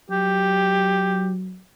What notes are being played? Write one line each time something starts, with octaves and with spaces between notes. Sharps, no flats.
F#3 G4